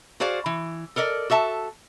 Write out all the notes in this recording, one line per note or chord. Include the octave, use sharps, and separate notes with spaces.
F#4 G#4 C5 D5 F5
E3
A4 A#4 D5 D#5
F#4 A4 E5 A5